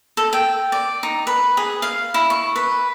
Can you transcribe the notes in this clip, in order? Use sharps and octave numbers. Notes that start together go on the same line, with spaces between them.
A4
G5
D5
D#4
B4
G#4
F5
E4
C#6
B4